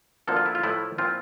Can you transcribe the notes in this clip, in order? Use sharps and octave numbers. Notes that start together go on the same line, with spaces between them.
D2 D3 F3 A#3 A4
F4
E4
F4
A2 F3 A3 E4
A#2 F3 C4 E4 F4